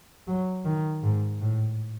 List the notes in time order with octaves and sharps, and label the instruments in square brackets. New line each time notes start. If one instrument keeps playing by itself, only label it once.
[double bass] F#3
D#3
G#2
A2